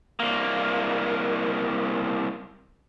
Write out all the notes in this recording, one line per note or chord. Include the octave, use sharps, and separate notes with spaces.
C2 A#3